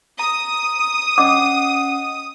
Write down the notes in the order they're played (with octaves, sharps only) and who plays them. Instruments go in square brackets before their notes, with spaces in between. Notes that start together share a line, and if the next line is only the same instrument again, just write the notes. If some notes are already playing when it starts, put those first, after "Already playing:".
[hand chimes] A#5 [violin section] D#6
[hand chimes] C#4 D#5 F#5 [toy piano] D6